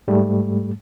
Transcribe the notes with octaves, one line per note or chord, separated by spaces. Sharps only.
G#2 G3 A3